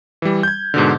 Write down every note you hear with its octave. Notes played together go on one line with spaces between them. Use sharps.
E3 G3
G6 G#6
G#2 B2 D3